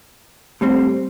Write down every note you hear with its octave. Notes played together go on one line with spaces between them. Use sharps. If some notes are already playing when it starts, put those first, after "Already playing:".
A2 G3 C4